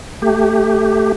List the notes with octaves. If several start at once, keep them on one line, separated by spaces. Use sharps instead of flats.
A3 G4